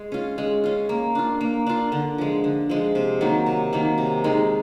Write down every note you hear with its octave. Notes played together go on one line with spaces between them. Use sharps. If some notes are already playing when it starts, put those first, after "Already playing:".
Already playing: G#3
C#4 F4
G#3
C#4 F4
A#3
D4 F4
A#3
D4 F4
D3
F3 G#3
D3
F3 G#3
C3
D#3 F#3 A#3
C3
D#3 F#3 A#3
C3
D#3 G#3